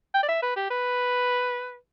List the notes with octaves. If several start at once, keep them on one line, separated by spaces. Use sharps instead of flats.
G5
D5
E5
B4
G4
B4